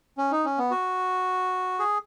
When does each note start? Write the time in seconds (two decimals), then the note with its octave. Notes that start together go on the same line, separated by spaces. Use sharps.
0.18 C#4
0.31 D#4
0.45 C#4
0.58 B3
0.71 F#4
1.79 G#4